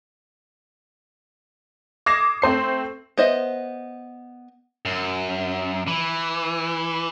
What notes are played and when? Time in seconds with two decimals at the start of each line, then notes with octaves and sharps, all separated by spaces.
2.06 D6 D#6 G#6 A#6 C7 E7
2.42 A3 C4 C5 C7
3.18 B3 C5 D#5 E5
4.85 F#2
5.87 E3